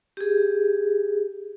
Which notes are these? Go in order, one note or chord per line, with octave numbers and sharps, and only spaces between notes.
G4 G#4